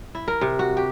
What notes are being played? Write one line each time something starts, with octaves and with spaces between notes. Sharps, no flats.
E4
A#4
C3
F#4
G4